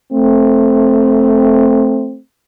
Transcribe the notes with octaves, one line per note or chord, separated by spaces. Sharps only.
A3 C4